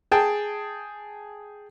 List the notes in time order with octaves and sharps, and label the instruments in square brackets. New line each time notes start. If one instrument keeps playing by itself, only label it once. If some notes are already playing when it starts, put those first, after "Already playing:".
[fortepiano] G#4 G5 A5